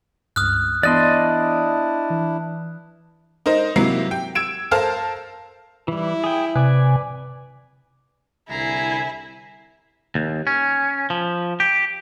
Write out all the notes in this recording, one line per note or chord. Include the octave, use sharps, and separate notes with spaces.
C#2 G2 D#6 F6 F#6
E3 B3 D4 E4 D5 D#5 C6 F#6
E3
D#4 A#4 C5 D#5
C3 F#3 A#3 E4 A#5 C7
G5
E6 G#6 D7 E7
A4 A#4 C5 F5 A5 F6
E3 G3 E4
G#4 G5
C3 B4 D5 G#5
C2 D3 E4 G#5 A#5 C7
D#2
C#4
F3
G4